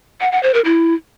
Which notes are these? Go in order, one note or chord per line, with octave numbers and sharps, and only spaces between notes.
F#5
F#5
C5
A#4
E4